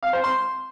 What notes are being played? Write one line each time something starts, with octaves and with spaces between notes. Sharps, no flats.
F5
C5
C6